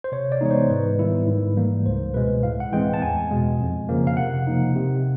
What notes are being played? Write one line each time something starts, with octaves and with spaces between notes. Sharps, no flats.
C5
C3 C#5
D5
E3 G#3 B3 D#4 C#5
C5
G#2 B4
D#3 G3 B3 E4
G#2
E3 G3 A#3
C#2 C5
B2 G#3 B4
A2 F5
F#5
E3 G#3 C4 G5
A5
E2 G#5
B2 G#3
F2
C#3 F3 A#3
F5
C3 F#5
F3 A#3 D#4
C3